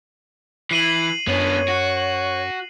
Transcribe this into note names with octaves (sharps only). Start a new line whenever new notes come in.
E3 C7 D#7 F#7
F#2 B3 D4 C#5
F#4